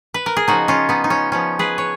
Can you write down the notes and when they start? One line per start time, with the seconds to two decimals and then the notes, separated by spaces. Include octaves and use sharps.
0.14 B4
0.26 A#4
0.37 G#4
0.48 C#3 F3 B3 D#4 F#4
0.68 C#4 F4
0.89 B3 D#4
1.04 D#4
1.10 C#4
1.32 C#3 F3 B3 C#4
1.59 G#4 B4
1.78 C#5